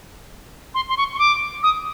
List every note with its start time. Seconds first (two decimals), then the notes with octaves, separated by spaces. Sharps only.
0.74 C6
0.89 C6
0.97 C#6
1.14 C#6
1.19 D6
1.63 D#6